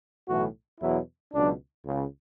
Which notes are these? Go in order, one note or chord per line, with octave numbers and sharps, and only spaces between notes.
B1 A2 E3 A3 F#4
E2 B2 F#3 E4
C#2 B2 F#3 D4
C#2 C#3